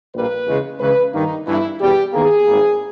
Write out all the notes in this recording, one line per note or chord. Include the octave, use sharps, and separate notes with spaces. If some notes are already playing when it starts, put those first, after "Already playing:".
A#1 A#2 G3 A#3 B4
E2 C#3 G#3
C#2 C#3 E3 B4
G2 D#3 A#3 D#4
G1 G2 E3 E4
E2 B2 G3 G4
E2 D#3 A#3 G#4
G#1 G#2 G3 A#3